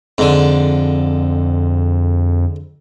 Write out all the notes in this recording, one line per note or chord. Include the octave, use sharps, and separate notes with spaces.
F2 G#2 D3